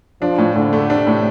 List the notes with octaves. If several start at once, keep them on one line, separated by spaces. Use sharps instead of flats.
F3 D4
A2
A2 D3
A3
C3 D4
A2